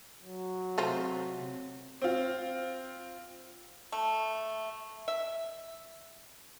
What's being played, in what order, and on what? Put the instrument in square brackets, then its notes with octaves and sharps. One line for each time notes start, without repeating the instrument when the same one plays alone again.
[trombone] F#3
[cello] C3 [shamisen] A3 F4 C5
[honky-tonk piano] C4 F4
[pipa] A3
E5